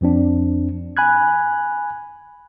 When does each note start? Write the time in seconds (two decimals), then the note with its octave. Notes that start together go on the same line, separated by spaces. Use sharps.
0.01 F2 F3 C4 D4
0.97 G#5 B5 F#6 G#6